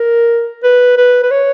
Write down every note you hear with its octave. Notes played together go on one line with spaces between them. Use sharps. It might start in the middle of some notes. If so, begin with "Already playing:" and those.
Already playing: A#4
B4
B4
B4
C#5